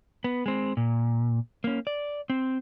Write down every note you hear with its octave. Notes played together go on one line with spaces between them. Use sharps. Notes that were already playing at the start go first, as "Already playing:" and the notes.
B3
G#3 C4
A#2
A#3 C#4
D5
C4